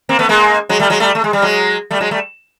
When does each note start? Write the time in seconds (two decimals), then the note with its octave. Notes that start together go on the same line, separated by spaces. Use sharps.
0.09 A#3 C4
0.19 A3 B3
0.29 G#3 A#3
0.69 F#3 G#3
0.79 G3 A3
0.90 F#3 G#3
1.00 G3 A3
1.15 A3
1.24 G#3
1.33 G3
1.42 F#3 G#3
1.91 G3 A3
2.00 F#3 G#3
2.11 G3 A3